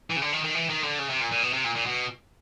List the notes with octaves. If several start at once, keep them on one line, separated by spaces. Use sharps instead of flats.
E3
C#3
D3
D#3
D#3
E3
D#3
D3
C#3
C3
A#2
A#2
B2
C3
A#2
A#2
B2